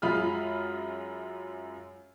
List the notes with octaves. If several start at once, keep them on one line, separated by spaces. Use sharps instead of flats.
F#2 G#3 F4 B5 D#6 F6